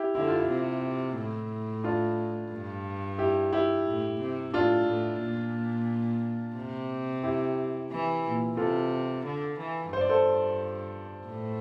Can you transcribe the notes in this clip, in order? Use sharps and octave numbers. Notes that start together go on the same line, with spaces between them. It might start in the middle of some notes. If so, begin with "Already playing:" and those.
Already playing: E4 G4
D3 E4
F4
E4
C3
A2
D4 F4
G2
E4 G4
E4 G4
A2
C3
A2 D4 F4
A2
A#2
C3
E4 G4
E3
A#2
C3 F4 A4
D3
E3
G2 C5
D5
A4 C5
A2